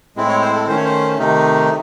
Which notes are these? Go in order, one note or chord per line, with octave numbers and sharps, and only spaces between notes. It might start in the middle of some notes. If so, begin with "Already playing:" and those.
A2 G#3 C4 E4
C#5
C5
A4
D#3 A3 C#4 C5
C#5
C5
C3 D#3 A3 D#4